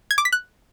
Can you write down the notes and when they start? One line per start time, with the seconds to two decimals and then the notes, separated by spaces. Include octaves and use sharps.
0.11 G#6
0.18 D6
0.25 B6
0.32 F#6